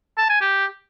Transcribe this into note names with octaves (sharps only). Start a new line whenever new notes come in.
A5
G#5
G4